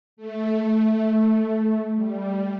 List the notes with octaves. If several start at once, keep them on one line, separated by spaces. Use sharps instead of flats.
A3
G3